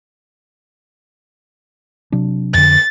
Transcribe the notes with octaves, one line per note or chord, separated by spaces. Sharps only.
C3 F#3 D4
F2 D3 A6